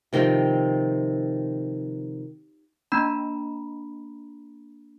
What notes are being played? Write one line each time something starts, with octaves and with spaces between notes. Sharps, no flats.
C3 D#3 F3 C4
A#3 D4 A#5 B5